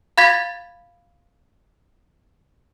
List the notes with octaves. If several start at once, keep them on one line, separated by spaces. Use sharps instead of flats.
F5 B5 G#6 A6 B6